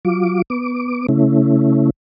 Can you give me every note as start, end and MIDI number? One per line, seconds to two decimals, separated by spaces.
0.05 0.42 54
0.05 0.42 65
0.05 0.42 86
0.50 1.06 59
0.50 1.06 86
1.09 1.90 49
1.09 1.90 57
1.09 1.90 61
1.09 1.90 64